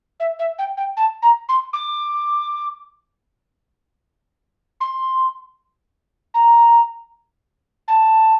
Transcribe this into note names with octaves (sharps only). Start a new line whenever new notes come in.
E5
E5
G5
G5
A5
A#5
C6
D6
C6
A#5
A5